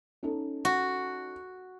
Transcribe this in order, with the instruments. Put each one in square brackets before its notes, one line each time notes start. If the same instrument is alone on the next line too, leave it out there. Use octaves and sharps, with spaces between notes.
[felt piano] C#4 D#4 A4
[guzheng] F#4